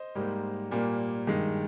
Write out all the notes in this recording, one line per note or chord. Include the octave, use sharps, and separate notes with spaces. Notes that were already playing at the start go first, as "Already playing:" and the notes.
Already playing: C5 D#5
G#2 G3 A#3
A#2 G3 A#3
G2 D#3 G#3